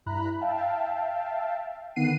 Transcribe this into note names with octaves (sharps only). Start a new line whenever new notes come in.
G2 E4 A#5 B5 F#6
E5 F5 G5 A5
D3 D#3 B3 F#5 C7 D#7